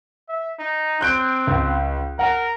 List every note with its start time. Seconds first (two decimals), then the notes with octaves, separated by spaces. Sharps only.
0.29 E5
0.59 D#4
1.01 C4 F#6 G6 D7
1.47 C#2
2.19 A#4 F#5